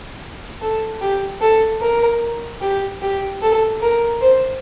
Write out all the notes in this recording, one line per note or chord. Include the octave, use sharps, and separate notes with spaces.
A4
G4
A4
A#4
G4
G4
A4
A#4
C5